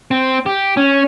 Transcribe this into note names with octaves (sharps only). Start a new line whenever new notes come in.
C4
G4
C#4